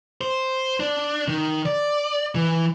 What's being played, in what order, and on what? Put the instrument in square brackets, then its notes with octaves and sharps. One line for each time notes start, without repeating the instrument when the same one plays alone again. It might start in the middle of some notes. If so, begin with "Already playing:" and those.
[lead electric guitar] C5
D4
D#3
D5
E3